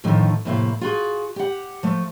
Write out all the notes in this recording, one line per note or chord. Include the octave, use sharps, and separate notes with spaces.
F2 A2 D3 D#3 F3
F2 A2 C3 A#3 E4 F5
F4 F#4 G#4
G4 F#5
F3 A3